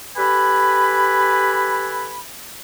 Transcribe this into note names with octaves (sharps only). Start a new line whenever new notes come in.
G4 A4 B4 G#5 B5